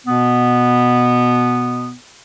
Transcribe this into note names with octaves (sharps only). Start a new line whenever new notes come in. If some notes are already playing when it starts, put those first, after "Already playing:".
B2 B3